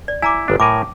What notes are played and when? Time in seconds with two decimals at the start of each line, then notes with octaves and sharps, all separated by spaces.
0.08 D5
0.22 E4 G#5 A#5 D6
0.48 G1 D4
0.60 A2 A#4 G#5 D6